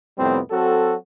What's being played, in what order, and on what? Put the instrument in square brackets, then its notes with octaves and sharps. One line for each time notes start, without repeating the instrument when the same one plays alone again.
[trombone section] F2 A2 C3 G3 B3 C4
F#3 C4 F#4 A4